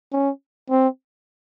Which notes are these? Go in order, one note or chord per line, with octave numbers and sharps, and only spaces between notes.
C#4
C4